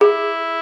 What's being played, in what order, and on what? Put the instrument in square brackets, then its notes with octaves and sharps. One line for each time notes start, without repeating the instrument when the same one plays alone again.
[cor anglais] E4 [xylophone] G#4